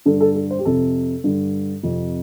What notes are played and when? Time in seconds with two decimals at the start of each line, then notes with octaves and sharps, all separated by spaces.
0.06 G2 D3 A4
0.20 A4
0.35 A4
0.51 C5
0.59 G4
0.65 F2 C3 A4
1.24 G2 D3
1.83 F2 C3